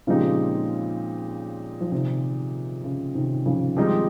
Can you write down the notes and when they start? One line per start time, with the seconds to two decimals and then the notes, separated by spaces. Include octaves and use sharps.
0.07 A#2 C#3 F3 G#3 C4 D#4 G4
1.81 F3
1.92 C3 D#3
2.84 C#3
3.15 C3 D#3
3.46 C#3 F3
3.77 D#3 F3 G3 G#3 C4 D#4 G4